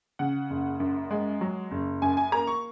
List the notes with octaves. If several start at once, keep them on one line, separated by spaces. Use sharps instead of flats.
C#3 F#5
F#1
F#2
G#3
F#3
F#1
F#2 G#5
G#5
A#3 A#5
C#6